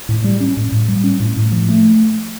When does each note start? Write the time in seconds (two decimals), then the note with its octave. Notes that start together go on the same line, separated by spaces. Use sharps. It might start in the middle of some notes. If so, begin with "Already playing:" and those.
0.09 A2
0.24 G3
0.40 C#4
0.57 A2
0.72 A2
0.88 G3
1.04 C#4
1.20 A2
1.37 A2
1.52 F3
1.69 A3